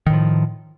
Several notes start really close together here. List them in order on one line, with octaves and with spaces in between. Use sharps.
D#3 A2 F3